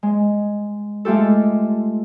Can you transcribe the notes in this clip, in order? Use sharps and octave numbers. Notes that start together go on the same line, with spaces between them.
G#3
G#3 A3 F4 G4 A4